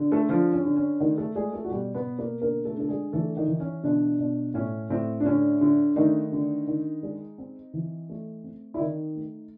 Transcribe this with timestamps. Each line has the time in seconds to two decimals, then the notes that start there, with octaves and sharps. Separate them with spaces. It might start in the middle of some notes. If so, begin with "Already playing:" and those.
Already playing: D3
0.12 A3 A4
0.29 D3 F3 F4
0.53 C#4
0.65 D3
0.76 C#4
1.00 D#3 A3 D#4
1.18 A3 A4
1.35 G#3 A3 G#4
1.53 A3 A4
1.64 F#4
1.71 B2 G3 G4
1.95 B3 B4
2.06 B2
2.19 A#3 A#4
2.41 D3 A#3 A#4
2.65 A3 A4
2.77 D3 A4
2.89 G#3 G#4
3.13 E3 A3 A4
3.37 D#3 D#4
3.48 E3
3.60 C#4
3.83 B2 D3 D4
4.19 B2
4.54 A2 C#4
4.90 A2 C4
5.20 D4
5.25 D3 C#4
5.61 D3
5.96 D#3 A3 D#4
6.32 D3
6.67 D#3
7.03 G#3
7.38 C4
7.74 E3
8.09 A3
8.44 C4
8.74 E4
8.80 D#3 D#4
9.15 A3